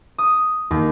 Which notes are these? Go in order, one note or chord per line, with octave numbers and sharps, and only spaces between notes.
D#6
D#2